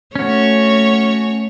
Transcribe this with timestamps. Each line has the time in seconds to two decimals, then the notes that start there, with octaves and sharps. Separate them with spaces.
0.15 A3 C#4 F#4 C#5